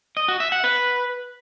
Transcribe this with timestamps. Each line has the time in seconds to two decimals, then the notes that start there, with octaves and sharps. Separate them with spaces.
0.17 D#5
0.28 F#4
0.40 E5
0.52 F#5
0.64 B4